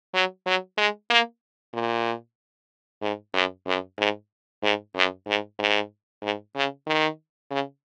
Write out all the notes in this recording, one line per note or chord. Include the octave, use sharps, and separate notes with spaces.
F#3
F#3
G#3
A#3
A#2
G#2
F#2
F#2
G#2
G#2
F#2
G#2
G#2
G#2
C#3
D#3
C#3